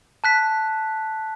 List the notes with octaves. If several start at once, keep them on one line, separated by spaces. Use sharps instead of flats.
A5 F#6 B6